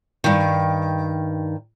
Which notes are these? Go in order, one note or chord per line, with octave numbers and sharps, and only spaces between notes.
G2 D#3